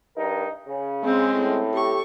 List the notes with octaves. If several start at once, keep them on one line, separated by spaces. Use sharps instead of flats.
G2 D#4 A#4
C#3
G#3 C4 C#4
A2
G4 A4 C#6